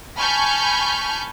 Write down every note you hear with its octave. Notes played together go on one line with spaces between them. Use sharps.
G#5 A5 B5 C#6 F6 G6